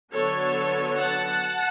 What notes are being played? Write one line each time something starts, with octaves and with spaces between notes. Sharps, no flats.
D3 F#3 B3 D4 A4 C#5
F#5 A5